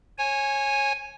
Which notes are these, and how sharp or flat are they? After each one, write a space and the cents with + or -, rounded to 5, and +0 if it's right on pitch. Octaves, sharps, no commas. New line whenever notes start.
C#5 -20 G#5 +0